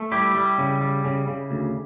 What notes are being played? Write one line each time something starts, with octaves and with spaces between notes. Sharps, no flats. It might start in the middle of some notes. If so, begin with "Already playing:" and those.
Already playing: A3
G3 E4 G4
G3
C#3
G3
C#3
C#3
D2